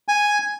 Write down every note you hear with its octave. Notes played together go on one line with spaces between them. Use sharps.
G#5